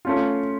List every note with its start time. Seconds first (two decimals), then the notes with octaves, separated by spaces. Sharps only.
0.05 A3 C#4 F4